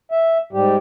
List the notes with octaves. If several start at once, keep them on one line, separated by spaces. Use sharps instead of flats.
E5
G#2 G3 G4